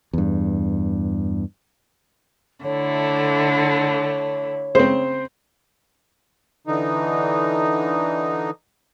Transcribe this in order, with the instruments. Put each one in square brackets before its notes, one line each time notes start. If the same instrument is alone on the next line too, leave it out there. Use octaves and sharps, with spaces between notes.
[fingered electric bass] E2 G2
[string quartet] D3 A3 E4 [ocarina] C#5
[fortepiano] C#3 C4 [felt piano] C5
[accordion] D3 E3 D#4